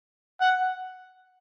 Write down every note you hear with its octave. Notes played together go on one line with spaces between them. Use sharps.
F#5